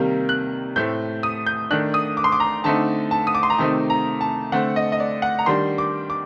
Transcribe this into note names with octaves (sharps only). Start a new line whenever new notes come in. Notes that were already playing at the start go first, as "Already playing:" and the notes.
Already playing: C3 D#3 G3 A#3
F#6
A2 A3 C4 G6
D#6
G6
D#3 A3 D4 F#6
D#6
D6
C6
D6
A#5
D3 A3 C4 D#4 A5
A5
D#6
D6
C6
A#5
C3 D#3 A3 C4 D#4 A5
A#5
A5
D3 A3 C4 F#5
D#5
D#5
D5
F#5
A#5
D#3 G3 D4 C6
D6
D6